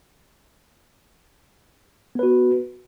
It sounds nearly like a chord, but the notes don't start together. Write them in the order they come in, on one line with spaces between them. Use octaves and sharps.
B3 B4 F#4